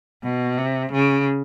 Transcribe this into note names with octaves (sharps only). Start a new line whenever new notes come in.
B2
C3
C#3